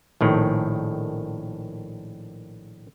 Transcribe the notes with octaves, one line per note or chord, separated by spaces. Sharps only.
A#1 A2 D#3